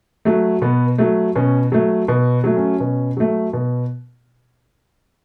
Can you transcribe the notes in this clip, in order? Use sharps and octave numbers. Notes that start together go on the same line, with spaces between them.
F#3 A3
B2 B3
F#3 A3
B2 C#4
F#3 A3
B2
F#3 A3
C#4
B2
F#3 A3
B2